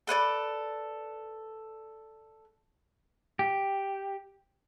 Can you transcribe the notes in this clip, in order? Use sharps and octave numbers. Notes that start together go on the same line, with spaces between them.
A4 B4 C#5 D5
G4